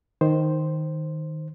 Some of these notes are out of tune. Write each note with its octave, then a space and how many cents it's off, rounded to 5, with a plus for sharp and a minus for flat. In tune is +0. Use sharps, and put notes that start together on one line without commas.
D#3 +0 C5 +0